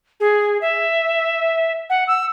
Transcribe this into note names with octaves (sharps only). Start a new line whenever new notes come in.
G#4
E5
F#5
E6